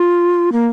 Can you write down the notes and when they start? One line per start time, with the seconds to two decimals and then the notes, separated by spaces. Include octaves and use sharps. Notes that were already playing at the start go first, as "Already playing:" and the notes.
Already playing: F4
0.52 A#3